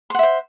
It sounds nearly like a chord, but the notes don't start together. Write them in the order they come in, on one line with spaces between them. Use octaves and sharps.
C6 F#5 E5 C5